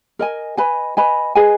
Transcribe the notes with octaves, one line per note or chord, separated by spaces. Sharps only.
A#4 D#5 G#5
B4 D#5 G#5 B5
B4 D#5 G#5 B5
G#4 B4 D#5 G#5